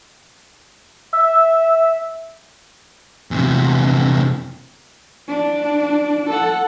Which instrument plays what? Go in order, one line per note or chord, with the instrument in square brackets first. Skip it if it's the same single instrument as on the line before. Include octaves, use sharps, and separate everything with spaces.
[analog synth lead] E5
[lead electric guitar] E2 C3
[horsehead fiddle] D4
A4 F#5